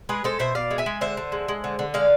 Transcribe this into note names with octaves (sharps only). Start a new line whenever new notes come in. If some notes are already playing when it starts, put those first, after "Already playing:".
G#3 G#4 B4
G#3 A4 C5
B2 C5 E5
B2 D5 F5
G#3
E5 G#5
G#3
D3 C5 E5
D3
G#3
G#3
D3
D3
G#3 D5 F5